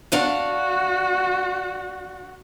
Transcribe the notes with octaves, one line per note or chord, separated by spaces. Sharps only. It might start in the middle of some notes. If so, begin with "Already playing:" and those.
D4 F#4 F5 F#5